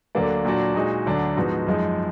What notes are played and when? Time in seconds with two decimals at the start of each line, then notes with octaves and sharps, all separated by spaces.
0.15 D2 D3 F#3 A#3 D4
0.45 A#2 F#3 D4 F#4
0.75 A#2 G#3 D#4 F#4
1.06 D2 D3 F#3 D4
1.37 G#2 F3 B3 D#4 F#4
1.67 F#2 F3 G#3 D#4